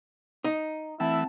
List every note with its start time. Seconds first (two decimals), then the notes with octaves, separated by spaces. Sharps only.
0.44 D#4
1.00 E3 A3 C4 E4 F#5 A5 E6